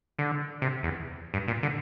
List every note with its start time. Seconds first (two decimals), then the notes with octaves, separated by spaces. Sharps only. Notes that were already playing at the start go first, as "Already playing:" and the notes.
0.19 D3
0.62 C3
0.83 E2
1.34 G2
1.48 A#2
1.63 D3